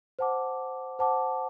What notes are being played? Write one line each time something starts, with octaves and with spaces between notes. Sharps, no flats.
C5 F#5 A5 D6
C5 F#5 A5 D6